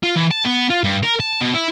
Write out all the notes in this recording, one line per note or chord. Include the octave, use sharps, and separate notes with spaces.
F4
E3
A5
B3
F4
G2
A#4
A5
B2
E4